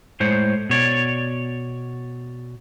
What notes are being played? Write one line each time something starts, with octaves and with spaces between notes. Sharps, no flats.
A2 G#3 C5 C#5
B2 C#5 D5